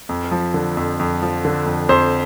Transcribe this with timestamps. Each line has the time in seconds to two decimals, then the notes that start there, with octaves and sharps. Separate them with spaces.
0.09 F2
0.31 F3
0.54 D3
0.77 F2
0.99 F2
1.22 F3
1.45 D3
1.66 F2
1.89 F2 C5